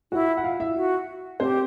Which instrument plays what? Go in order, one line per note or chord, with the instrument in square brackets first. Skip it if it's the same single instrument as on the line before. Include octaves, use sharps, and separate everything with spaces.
[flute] E4 [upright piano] F#4 F#5
[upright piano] F#5
F4 F5
E4 E5
[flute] F#4
[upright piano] C4 C5 [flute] G4